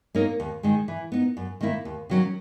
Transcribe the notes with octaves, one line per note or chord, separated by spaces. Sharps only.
A#3 D#4 A#4 C#5
D#2
D#3 G#3
E3
B3 D#4
F#2
D#3 A#3 E4
D#2
D#3 F#3 C#4